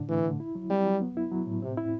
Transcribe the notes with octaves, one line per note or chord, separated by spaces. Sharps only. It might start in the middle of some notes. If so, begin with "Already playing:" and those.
Already playing: A2 D3 D4
E3 A3
D3
E4
F#3
G3 C4
F#3
B3
E4
F#3
A2
C3 C4
E4